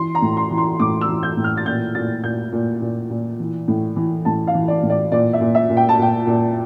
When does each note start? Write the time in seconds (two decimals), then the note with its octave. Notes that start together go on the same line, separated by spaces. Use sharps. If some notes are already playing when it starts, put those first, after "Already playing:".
Already playing: E3 C6
0.15 A#5
0.22 A2
0.37 C6
0.50 E3
0.58 C6
0.80 A2 D6
1.01 E6
1.08 E3
1.23 G6
1.37 A2
1.44 F6
1.57 A6
1.66 A#2 G6
1.95 A#2 A6
2.23 A#2 G6
2.52 A#2
2.82 A#2
3.10 A#2
3.39 E3
3.68 A2
3.96 E3
4.25 A2 A5
4.47 F5
4.54 E3
4.68 D5
4.83 A2
4.90 D5
5.12 A#2 D5
5.33 E5
5.41 A#2
5.55 E5
5.70 A#2
5.77 G5
5.89 A5
5.98 A#2 G5
6.27 A#2